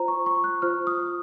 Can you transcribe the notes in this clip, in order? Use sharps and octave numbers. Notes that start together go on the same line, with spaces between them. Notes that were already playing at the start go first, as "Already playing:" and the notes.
Already playing: F4 C5 A#5
C#6
C#6
F#6
F4 C5 F6
D#6